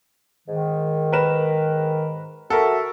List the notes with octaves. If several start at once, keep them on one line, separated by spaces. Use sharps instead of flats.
G#2 D#3
A#4 B4 E7
F#4 A4 A#4 E5